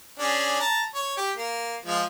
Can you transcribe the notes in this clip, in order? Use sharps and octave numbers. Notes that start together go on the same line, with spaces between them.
C#4 D4 G#4
A5 A#5
C#5
G4
A#3
F3 G#3 F4